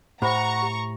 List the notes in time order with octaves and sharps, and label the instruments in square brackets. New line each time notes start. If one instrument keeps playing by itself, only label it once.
[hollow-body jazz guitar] A2 [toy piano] G4 C5 B5 [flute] F#5 [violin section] A#5 C#6
[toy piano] G4